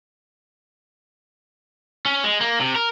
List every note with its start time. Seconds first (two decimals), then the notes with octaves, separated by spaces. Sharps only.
2.05 C#4
2.24 G#3
2.41 A#3
2.60 C3
2.75 A#4